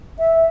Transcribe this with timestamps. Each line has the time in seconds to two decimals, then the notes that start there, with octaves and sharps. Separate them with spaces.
0.19 E5